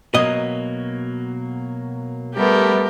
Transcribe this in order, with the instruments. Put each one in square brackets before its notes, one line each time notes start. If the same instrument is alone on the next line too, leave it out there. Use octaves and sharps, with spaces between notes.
[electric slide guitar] B2 F#3 A#3 [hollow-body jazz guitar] D#5
[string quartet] G3 A3 B3 [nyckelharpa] G4 A#4